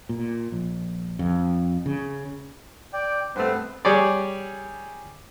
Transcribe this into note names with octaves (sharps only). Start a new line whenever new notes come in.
A#2
A#1
F2
C#3
D5 G5
G2 A3 B3 C4 B4
G3 G#4 C#5 D5